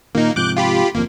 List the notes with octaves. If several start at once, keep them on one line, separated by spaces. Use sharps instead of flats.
A#2 D#3 A#3 D#4
G#2 C3 F3 D6 F#6 G6
F4 G4 B5
G1 F2 A#3